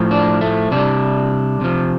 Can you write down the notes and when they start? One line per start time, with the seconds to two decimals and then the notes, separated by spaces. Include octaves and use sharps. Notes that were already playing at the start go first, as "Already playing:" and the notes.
Already playing: A2 F3
0.11 D4
0.41 A3
0.71 C3 G3 D4
1.61 C3 F3